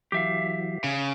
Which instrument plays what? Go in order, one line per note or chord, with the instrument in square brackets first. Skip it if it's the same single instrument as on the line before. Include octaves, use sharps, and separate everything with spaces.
[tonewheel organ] E3 F#3 [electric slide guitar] G4 E5 F5
[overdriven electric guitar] C#3